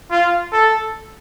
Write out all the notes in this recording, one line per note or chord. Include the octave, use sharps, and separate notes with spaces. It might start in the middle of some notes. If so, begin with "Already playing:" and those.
F4
A4